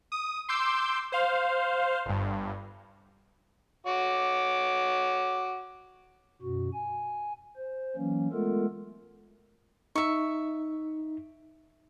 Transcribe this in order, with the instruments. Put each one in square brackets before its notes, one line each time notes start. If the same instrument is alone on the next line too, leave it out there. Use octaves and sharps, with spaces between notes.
[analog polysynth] D#6
C6 D6 E6 G6
C5 F5
G1 G2
[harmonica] F#4 C#5 D6
[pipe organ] F#2 B2 F#4
G#5
C5
E3 F#3 A#3 C#4
G#3 A3 B3 F4 A4 A#4
[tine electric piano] D#4 [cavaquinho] E5 C#6